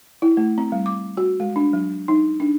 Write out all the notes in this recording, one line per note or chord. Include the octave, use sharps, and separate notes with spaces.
E4
A3
C4
G3
D6
F#4
G#3
D4
F#3
D#4
D4